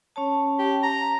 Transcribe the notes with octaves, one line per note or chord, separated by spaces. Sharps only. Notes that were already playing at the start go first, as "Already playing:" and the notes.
C#4 C#5 A5
G4
A#5